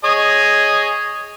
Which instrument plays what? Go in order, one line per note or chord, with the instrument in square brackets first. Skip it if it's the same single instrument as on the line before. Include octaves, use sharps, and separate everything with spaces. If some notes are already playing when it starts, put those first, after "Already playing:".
[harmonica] G#4 C#5 D#5